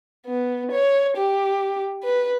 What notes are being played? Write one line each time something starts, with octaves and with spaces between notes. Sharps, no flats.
B3
C#5
G4
B4